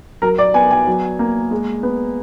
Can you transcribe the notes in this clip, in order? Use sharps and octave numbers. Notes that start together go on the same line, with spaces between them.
F#3 A#4
D5
B3 G#5
G#5
F#3
A#3
G#3
B3